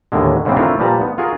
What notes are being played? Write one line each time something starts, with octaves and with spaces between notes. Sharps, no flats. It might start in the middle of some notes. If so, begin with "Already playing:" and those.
D#2 A2 D3 G#3
G#2 C#3 E3 B3 C4
A3 C4 D4 E4 F4 A#4
A#2 F3 G3 B4 A5 A#5
B3
F4 F#4 G#4 A#4